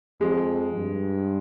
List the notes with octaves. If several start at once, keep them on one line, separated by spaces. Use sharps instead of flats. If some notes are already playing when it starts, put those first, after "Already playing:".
F2 G#3
G2